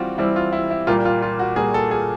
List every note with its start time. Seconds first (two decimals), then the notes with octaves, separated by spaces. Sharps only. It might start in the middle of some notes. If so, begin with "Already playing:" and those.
Already playing: E3 G3 C4 F4 F#4
0.18 E3 G3 C4 E4
0.36 F4
0.53 E4
0.70 E4
0.87 A#2 G3 A#3 F4
1.05 F4
1.22 F4
1.39 F#4
1.56 A#2 G3 A#3 G#4
1.74 A4
1.91 G#4